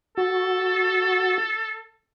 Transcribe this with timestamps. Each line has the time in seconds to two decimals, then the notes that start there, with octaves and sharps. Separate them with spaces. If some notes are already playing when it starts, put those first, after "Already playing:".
0.18 F#4 A4